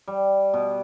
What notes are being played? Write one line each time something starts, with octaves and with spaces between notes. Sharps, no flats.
G3
B2